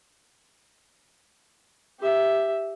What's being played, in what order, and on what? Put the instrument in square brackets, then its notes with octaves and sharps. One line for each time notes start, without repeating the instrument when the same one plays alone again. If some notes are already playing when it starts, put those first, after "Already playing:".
[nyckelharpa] G4 E5